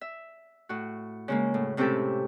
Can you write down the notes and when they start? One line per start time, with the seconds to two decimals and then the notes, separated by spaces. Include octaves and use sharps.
0.01 E5
0.69 A2 F#4
1.28 C#3 G#3 A#3
1.54 A2
1.77 A2 C3 C#4 E4 G4 A4